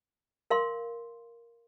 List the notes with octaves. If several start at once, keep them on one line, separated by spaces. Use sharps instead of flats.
A#4 F5 C6